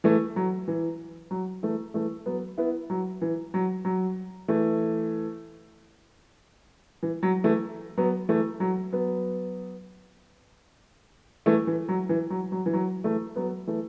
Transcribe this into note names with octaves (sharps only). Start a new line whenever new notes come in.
E3 A3
F#3
E3
F#3
E3 A3
E3 A3
F#3 B3
B3 E4
F#3
E3
F#3
F#3
E3 A3
E3
F#3
E3 A3
F#3 B3
E3 A3
F#3
F#3 B3
E3 A3
E3
F#3
E3
F#3
F#3
E3
F#3
E3 A3
F#3 B3
E3 A3